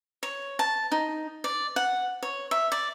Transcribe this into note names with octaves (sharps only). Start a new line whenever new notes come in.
C#5
A5
D#4
D5
F#5
C#5
E5
D5